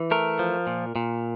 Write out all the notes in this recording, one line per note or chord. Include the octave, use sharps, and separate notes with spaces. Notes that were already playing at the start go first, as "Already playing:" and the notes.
Already playing: E3
A3 A#4
F3
A#2
A#2